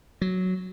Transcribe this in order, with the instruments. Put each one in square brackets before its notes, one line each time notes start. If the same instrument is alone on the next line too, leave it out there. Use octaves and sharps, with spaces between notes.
[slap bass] F#3